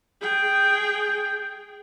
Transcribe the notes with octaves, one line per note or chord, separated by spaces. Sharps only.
G#4 G5